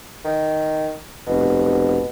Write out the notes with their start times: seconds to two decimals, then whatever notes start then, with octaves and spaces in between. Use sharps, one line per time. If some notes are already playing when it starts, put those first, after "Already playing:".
0.25 D#3
1.27 F1 B2